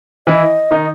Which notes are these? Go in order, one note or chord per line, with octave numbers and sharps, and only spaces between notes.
E3 E4 D#5
D#3 D#4